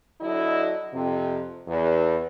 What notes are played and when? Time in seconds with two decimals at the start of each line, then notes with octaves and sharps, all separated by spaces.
0.21 D3 F#3 E4 D#5
0.94 F2 C3
1.67 E2